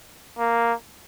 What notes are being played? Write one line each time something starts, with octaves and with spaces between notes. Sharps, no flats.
A#3